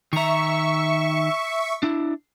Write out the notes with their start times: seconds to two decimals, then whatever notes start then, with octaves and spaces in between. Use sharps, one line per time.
0.13 D#3 E5 A#5 C#6
1.83 D4 E4